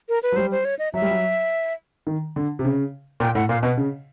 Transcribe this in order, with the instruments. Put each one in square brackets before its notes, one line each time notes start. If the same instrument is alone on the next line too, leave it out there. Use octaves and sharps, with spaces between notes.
[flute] A#4
B4
[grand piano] F#3
[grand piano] G3 [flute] C5
[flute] C5
C#5
D#5
[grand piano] F#3 [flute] E5
[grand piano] G3
F#3
D#3
D3
C3
C#3
[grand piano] A#2 [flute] G5
[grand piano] A2 [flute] F#5
[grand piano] A#2 [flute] F5
[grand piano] B2 [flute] B4
[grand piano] C#3